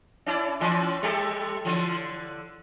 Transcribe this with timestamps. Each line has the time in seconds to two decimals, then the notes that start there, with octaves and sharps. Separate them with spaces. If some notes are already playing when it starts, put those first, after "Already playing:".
0.26 C#4 E4 D5
0.60 A2 E3 C#4
1.03 G3 G4 A4
1.65 D3 E3